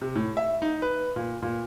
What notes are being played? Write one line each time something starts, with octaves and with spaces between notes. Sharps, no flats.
C3
A2
E5
D#4
B4
A#2
A#2